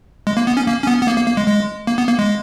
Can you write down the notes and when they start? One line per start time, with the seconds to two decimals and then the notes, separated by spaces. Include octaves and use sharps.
0.27 G#3
0.37 A#3
0.47 B3
0.57 C#4
0.67 A#3
0.83 C#4
0.87 B3
1.02 B3
1.07 A#3
1.17 A#3
1.27 A#3
1.37 G#3
1.48 G#3
1.87 A#3
1.98 B3
2.08 A#3
2.19 G#3